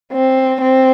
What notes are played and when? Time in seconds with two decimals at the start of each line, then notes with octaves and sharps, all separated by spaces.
0.13 C4
0.61 C4